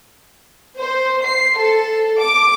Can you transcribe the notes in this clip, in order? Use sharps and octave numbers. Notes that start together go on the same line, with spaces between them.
C5
C7
A4
D6